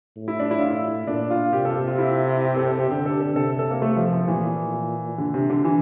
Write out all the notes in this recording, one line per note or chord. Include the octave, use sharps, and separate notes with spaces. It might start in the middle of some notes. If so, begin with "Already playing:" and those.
A2
E4
D4
E4
F4
E4
A#2 D4
F4
C3 G4
A4
F4
G4
F4
E4
G4
A4
A4
G4
D3 G4
A4
A4
C3 A4
A4
A#3
A3
F3
F3
A#2 E3
D3
C3
D3
E3